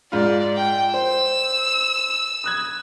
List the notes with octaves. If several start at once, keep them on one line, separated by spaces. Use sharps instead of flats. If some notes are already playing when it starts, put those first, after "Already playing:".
G#2 F4 D5
G5
C5 E6
D#6 F#6 G#6